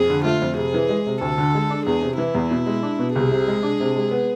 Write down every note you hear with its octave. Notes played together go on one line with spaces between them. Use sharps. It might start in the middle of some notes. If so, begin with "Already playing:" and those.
Already playing: F2 G#4
D3
A3 F4
F2
C3 G#4
E3
G#3
C3
D2 A4
D3
G#3
D4
E2 G#4
C3
E3 E4
E2
B2
G#3
D4
B2
C2 G#4
C3
G#3
D4
C3
G#3
B3